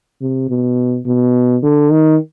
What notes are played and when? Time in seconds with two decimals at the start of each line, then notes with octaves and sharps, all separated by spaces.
0.21 C3
0.49 B2
1.06 B2
1.63 D3
1.91 D#3